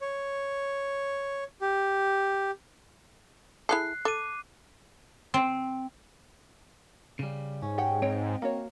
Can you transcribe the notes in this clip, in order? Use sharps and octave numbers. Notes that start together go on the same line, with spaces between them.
C#5
G4
E4 G#4 A4 F#6 C7
A4 D6 D#7
C4
C#3 G3
G#2 C#4
G4 F#5 G5
C4 C#5 D#5 G5
A#3 F#4 C#5